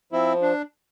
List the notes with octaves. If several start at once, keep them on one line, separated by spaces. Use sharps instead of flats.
F3 C4 E4
D4